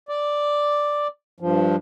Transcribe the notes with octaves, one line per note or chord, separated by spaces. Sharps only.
D5
G2 F3